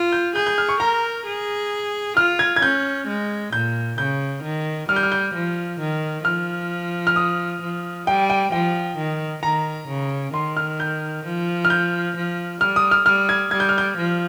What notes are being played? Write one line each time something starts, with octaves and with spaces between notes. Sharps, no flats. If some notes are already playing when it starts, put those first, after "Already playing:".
Already playing: F4
G6
G#4 G6
G6
F6
C#6
A#4 A#5
G#4
F4 F6
G#6
G#6
C#4 G6
G#3
A#2 G6
C#3 G6
D#3
G3 F6
G6
F6
G6
F3
D#3
F3 F6
F6
D#6
F3
G3 G5
G5
F3 G5
D#3
D#3 A#5
C#3
D#3 C6
F6
G6
F3
F6
G6
F3
G3 F6
D#6
F6
G3 F6
G#6
G3 G#6
G6
F6
G6
F3